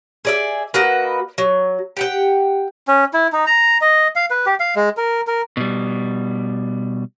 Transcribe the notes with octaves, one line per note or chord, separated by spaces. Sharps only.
G#4 D5 E5
A#3 F#4 B4 D#5
F#3
G4 F#5 G5
C#4
E4
D#4
A#5
D#5
F5
B4
G4
F5
G#3
A#4
A#4
B2 G3